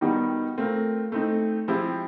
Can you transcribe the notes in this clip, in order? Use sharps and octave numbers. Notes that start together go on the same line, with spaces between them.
D#3 G3 B3 D#4 F#4
A3 C4 F4 A#4
A3 C4 D#4
F3 G#3 C4 E4 G4